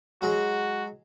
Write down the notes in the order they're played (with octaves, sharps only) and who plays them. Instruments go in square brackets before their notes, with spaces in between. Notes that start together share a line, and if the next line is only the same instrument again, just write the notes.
[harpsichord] F#3 G#3 [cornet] F#4